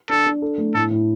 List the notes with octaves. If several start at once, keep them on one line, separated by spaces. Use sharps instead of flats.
D4 A4
D4
A4
A3
A2 A4
A2